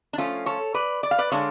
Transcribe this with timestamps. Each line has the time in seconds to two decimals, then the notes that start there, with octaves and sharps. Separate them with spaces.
0.13 D4
0.18 F3 A3 C#4 F4
0.46 A4 C#5
0.74 B4 D5
1.03 D5
1.11 F5
1.18 B4 D5
1.32 D3 G#3 D4 C#5 F5